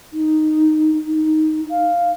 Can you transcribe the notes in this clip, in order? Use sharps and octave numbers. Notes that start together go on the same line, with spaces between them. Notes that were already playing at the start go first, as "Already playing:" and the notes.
D#4
D#4
F5